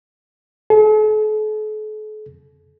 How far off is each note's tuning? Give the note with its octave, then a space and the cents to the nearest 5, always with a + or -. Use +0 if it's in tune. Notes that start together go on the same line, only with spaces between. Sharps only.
A4 -45